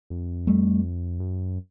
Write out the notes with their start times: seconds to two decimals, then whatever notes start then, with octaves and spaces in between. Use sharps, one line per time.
0.10 F2
0.47 G3 A3
1.20 F#2